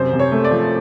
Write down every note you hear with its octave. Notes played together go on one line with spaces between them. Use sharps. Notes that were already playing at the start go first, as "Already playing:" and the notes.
Already playing: F#2 C3 C5
C3
C#5
A3
D5
F3